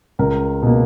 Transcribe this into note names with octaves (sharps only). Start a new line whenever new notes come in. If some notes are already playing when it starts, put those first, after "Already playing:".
C#2 A#4
B2 A#3